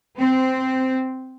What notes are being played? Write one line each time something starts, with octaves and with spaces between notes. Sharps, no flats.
C4